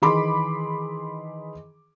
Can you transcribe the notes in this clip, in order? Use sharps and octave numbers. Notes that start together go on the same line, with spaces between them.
D#3 E3 G#4 B5 C6 D6